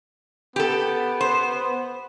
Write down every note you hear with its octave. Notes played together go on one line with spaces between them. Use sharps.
B3 G4 A4
C5